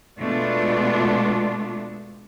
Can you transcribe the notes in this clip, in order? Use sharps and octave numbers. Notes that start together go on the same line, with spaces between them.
B2 G#3 A3 B3 D4 F4